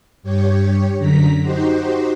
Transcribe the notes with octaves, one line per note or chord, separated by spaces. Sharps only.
G2 G4 C#5
F#2 D3 A#5 B6
D#4 F#4 G4 C5